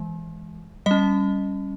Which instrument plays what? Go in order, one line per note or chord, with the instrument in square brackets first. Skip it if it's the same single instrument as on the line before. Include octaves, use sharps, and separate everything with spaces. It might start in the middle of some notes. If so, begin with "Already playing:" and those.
Already playing: [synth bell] E3 G#3
G3 C#4 D#5